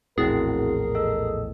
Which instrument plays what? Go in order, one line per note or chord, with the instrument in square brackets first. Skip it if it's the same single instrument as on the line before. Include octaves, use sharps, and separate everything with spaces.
[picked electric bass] A#1 E2 A2 [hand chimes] C4 E4 F#4 [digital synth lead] G#4 [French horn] A#4
[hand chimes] A4 D#5 E6